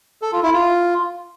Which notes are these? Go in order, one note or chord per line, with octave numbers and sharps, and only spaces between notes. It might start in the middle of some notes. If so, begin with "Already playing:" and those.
A4
F4
E4
F4